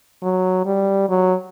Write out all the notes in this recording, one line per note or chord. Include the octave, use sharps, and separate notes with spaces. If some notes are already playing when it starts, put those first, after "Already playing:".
F#3
G3
F#3